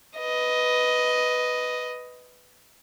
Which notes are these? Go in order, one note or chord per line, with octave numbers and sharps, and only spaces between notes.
B4 D#5